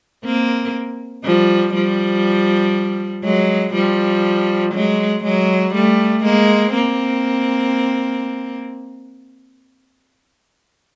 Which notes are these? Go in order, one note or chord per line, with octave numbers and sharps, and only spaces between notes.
A#3 C4
F3 G3
F3 G3
F#3 G#3
F3 G3
F#3 G#3
F#3 G#3
G3 A3
G#3 A#3
A#3 C4